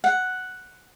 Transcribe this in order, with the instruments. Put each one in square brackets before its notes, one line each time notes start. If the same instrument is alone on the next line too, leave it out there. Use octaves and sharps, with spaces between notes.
[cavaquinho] F#5